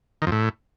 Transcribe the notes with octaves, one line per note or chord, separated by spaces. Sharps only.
D#3
F2
A2